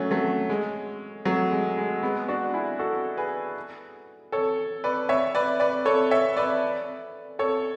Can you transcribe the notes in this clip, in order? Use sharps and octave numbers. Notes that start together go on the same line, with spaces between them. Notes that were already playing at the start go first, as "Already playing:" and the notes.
Already playing: F#3 A3 C#4
F#3 A3
G#3
F#3 A3
G#3
G#3
G#3 B3
D4 F#4
E4 G#4
F#4 A4
G#4 B4
A4 C#5
B4 D5
C#5 E5
B4 D5
B4 D5
A4 C#5
C#5 E5
B4 D5
A4 C#5